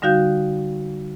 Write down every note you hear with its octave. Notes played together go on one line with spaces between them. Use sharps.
D3 G3 D#4 F#4 F5 G6